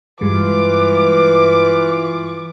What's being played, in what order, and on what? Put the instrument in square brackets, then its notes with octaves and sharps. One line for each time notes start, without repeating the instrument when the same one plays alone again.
[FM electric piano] G2 G3 G#3 [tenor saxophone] E3 [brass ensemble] F4 B4 [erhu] D6